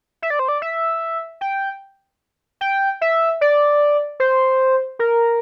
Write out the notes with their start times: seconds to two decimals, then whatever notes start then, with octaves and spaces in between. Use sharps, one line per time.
0.22 E5
0.30 D5
0.39 C5
0.48 D5
0.62 E5
1.41 G5
2.61 G5
3.01 E5
3.41 D5
4.20 C5
4.99 A#4